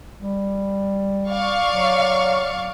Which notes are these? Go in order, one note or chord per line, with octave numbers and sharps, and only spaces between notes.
G3
D5 F5 C#6
F#3